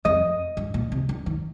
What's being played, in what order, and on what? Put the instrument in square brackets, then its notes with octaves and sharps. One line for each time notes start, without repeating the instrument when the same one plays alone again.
[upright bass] F2 [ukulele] D#5
[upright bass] G2
A#2
C3
D3
D#3